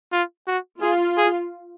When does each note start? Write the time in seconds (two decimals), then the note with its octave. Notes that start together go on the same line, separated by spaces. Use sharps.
0.12 F4
0.48 F#4
0.81 F4 G#4
1.17 G#4